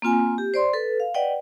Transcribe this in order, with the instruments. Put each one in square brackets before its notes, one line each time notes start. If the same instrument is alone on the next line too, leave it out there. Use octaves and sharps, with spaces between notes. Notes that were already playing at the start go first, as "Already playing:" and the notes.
[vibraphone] A#3 C4 F4 G#5
G4
C5 D5 C6
A4 B4
F5
B4 D5 D#5 F#5 G5